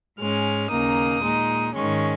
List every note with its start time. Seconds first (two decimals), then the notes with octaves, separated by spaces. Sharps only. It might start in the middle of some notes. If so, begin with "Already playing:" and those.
0.19 G#2 G#3 C#4 F6
0.70 D#2 C#3 A#3 D#4 D#6
1.22 A#2 G#3 D#4
1.73 G#2 D#3 G#3 C#4 C#6